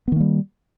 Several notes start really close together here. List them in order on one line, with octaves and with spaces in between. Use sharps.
B3 D#3 A#3 G3